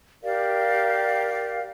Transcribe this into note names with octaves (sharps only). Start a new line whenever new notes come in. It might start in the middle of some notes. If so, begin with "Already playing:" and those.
G4 A#4 D5 F5